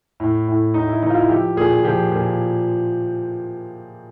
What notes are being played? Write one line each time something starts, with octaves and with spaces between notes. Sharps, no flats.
A2
A2
A2 D#4
E4
E3 D#4
F4
E4
F3 G4
A#2 G#4
F3 G4
A#2